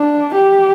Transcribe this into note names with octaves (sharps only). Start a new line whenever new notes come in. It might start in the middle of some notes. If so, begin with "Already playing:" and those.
Already playing: D4
G4